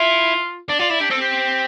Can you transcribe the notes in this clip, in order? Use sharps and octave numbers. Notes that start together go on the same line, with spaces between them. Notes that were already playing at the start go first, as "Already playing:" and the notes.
Already playing: E4 F4
D4 D5
F4 D5
E4 D5
D4 G4
C4 A4
G4